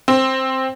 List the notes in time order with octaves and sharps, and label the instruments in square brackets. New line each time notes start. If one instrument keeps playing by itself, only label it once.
[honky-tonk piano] C4